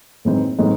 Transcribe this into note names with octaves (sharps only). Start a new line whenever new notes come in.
A2 E3 G#3 C4 D#4
A2 E3 G#3 C4 D#4